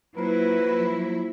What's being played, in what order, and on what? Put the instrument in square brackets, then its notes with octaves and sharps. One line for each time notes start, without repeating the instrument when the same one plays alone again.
[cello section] F#3 E4 [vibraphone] A#3 F4 C5 [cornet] B4